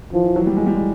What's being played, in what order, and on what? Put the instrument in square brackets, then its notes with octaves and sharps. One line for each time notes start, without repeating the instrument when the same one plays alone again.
[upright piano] E3 [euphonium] F3
[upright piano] E3
E3 F#3
G3
G#3
G3
G#3